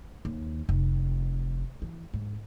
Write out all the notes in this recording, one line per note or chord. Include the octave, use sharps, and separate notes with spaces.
D#2
F1
E3
G#2